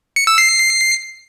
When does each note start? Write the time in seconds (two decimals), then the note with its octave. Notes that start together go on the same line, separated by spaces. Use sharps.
0.16 C#7
0.27 E6
0.38 C7